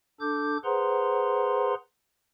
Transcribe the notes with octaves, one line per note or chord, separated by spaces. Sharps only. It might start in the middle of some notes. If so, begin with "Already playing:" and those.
D4 A4 D6 G6
G#4 B4 C5 F#5 A#5 C6